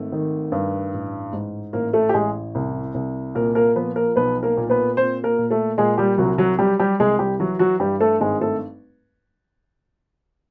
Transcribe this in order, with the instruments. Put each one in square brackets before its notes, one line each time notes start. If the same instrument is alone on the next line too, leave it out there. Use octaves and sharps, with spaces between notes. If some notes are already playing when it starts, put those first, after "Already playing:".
Already playing: [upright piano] G#1 A3
D#3
G2
A1
G#2
A1 A#3 A#4
A3 A4
G4
A1 G#3 G#4
C2
C2
A#2 A#3 A#4
A#3 A#4
F3 B3 B4
A#3 A#4
B1 B3 B4
A#3 A#4
A#2
B3 B4
A#2 C4 C5
A#3 A#4
A#2
A3 A4
A#2 G#3 G#4
G3 G4
C2 F#3 F#4
F#3 F#4
F#3 G3 G4
G3 G4
C2 G#3 G#4
G3 G4
E3 F#3 F#4
F#3 F#4
G2 G3 G4
A3 A4
G#1 G#3 G#4
A3 A4